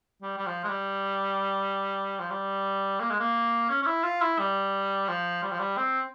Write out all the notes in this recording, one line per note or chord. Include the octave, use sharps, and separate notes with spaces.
G3
G3
F3
G#3
G3
F3
G3
A#3
G#3
A#3
C#4
C#4
E4
F4
E4
G3
F3
G3
F3
G3
C4